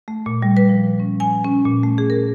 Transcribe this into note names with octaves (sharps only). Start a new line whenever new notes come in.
A3
A#2
G3
B4
F3
C#4
G#5
C#4
A#2
A3
G#4
A#4